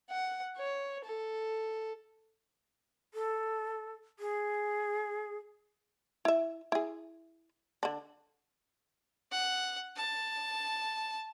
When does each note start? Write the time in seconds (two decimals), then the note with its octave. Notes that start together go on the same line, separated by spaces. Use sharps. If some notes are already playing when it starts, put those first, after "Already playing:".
0.10 F#5
0.57 C#5
1.05 A4
3.14 A4
4.19 G#4
6.25 E4 E5
6.72 E4 G#4
7.83 D3 D4
9.32 F#5
9.96 A5